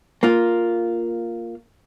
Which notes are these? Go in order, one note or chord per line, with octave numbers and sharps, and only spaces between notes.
A#3 F4